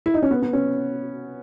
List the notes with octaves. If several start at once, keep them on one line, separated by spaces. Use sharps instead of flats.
E4
D#4
C#4
B3
B3
C#4